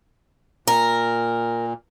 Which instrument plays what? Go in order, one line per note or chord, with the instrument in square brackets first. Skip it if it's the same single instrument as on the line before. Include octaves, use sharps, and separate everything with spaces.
[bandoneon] A#2 [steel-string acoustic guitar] A#4